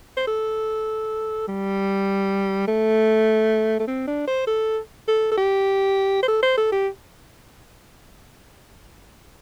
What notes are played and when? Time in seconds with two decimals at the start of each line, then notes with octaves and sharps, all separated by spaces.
0.17 C5
0.27 A4
1.48 G3
2.68 A3
3.80 A3
3.88 C4
4.07 D4
4.27 C5
4.47 A4
5.08 A4
5.31 A4
5.38 G4
6.23 C5
6.28 A4
6.42 C5
6.57 A4
6.72 G4